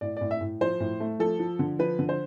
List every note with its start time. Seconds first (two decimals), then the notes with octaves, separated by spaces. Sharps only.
0.01 A2 D5
0.17 A2 D5
0.31 E5
0.41 A2
0.61 F3 C5
0.80 A2
1.00 A3
1.19 F3 A4
1.39 F3
1.59 D3
1.79 F3 B4
1.99 D3
2.09 C5